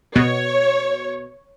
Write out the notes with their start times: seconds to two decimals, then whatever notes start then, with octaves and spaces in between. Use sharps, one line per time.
0.16 B2 C#5